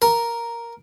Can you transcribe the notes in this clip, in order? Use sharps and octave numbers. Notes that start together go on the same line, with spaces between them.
A#4